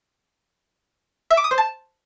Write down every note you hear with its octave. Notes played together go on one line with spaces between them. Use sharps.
E5
D6
D#6
C5
A5